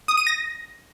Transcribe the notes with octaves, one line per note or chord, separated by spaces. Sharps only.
D#6
D#7
A#6